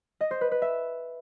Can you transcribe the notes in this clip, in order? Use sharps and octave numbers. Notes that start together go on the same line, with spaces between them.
D#5
C5
B4
B4
E5